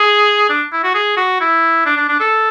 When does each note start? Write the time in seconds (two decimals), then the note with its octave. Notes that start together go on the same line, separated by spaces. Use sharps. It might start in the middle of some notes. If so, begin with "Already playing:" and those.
Already playing: G#4
0.49 D4
0.72 E4
0.84 F#4
0.94 G#4
1.17 F#4
1.41 E4
1.86 D4
1.96 D4
2.09 D4
2.20 A4